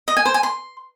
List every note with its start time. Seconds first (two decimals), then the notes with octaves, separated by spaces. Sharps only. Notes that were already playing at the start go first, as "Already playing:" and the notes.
0.08 D#5
0.17 G#5
0.25 C5
0.34 G#5
0.43 C6